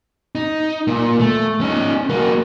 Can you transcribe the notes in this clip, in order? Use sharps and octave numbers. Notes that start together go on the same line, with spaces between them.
D#4
A#2
A3
C#4 D#4
F#3 A#3